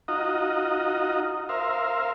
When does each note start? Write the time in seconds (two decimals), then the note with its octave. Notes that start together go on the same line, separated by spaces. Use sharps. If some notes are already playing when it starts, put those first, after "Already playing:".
0.08 D#4 F4 F#4 D#5 A#5
1.49 A#4 C5 E5 F5